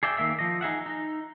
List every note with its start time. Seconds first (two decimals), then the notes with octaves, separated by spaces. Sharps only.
0.03 G#4 D5 E5 G5
0.17 D#3 A#3 E5 E6
0.39 F3 D#5
0.61 D#4 G#4 E5 F#5
0.86 D#4